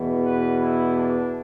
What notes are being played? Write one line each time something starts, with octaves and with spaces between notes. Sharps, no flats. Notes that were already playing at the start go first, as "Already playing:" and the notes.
Already playing: E2 B2
B4
E4
D4